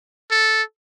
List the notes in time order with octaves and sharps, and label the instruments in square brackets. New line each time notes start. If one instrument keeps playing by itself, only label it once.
[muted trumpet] A4